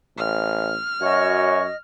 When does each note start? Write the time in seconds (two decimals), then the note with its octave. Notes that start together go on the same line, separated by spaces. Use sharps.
0.18 A1 F6
1.02 F#2 F#4 C#5 D#5